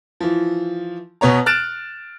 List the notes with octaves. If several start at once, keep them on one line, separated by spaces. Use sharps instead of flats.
E3 F3
B2 B3 C#5 A#5
F6 F#6 A6 D7 E7